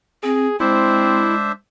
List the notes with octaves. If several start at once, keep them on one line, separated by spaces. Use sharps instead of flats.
C4 G#4
G#3 C4 D4 E4 C5 E5